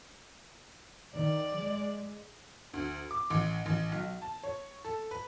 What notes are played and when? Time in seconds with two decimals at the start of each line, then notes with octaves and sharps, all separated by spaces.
1.14 D#3 D5
1.56 G#3
2.74 D2
3.11 D6
3.30 A1
3.66 A1
3.92 B1
4.21 A5
4.43 C#5
4.85 A4
5.11 B4